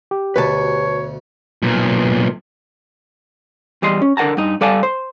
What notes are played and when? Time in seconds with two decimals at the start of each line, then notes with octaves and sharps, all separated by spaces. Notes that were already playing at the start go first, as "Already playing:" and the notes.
0.11 G4
0.36 D2 B2 B4 C#5 A5
1.62 B1 A#2
3.82 E2 G3 D#5 C6
4.02 C#4
4.17 D3 A#4 F#5 A5 A#5
4.37 G2 D#4
4.61 G3 A4 D5 F5 G#5 A5
4.83 C5